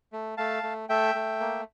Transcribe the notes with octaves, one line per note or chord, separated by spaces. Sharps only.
A3
A3 F5 A5
A3
A3 E5 G5
A3
A#3